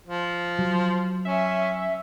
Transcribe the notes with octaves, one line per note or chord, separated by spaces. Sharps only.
F3
F#3
C#4 E5